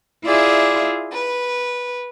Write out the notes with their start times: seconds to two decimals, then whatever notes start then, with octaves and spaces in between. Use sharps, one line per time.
0.24 E4 F4 G#4 D5 E5
1.13 B4